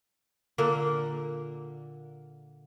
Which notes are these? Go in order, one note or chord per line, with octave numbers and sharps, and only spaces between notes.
A#2 D3 A#3